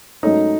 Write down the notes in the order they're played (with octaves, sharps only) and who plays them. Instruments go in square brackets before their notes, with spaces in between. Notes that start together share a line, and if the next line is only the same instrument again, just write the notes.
[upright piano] G#2 F#3 A3 C#4 [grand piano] D#4